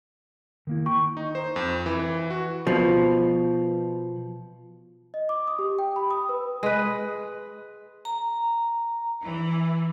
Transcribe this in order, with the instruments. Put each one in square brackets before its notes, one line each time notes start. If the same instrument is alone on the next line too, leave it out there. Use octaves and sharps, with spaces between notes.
[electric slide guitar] D#3 A#3 E4
[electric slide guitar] G5 [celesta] C#6
[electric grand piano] D#4
C5
F2
E3
E3
F#4
[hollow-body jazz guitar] B2 F3
[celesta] D#5
D6
D#6
G4
G5
B5
D#6
B4
[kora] G#3 B4
[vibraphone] A#5
[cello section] E3